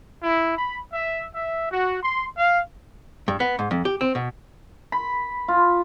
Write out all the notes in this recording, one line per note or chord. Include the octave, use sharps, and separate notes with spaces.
E4
B5
E5
E5
F#4
C6
F5
G2
B3
G#2
F2
G4
C4
B2
B5
F4